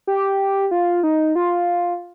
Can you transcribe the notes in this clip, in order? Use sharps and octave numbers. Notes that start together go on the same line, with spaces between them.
G4
F4
D#4
F4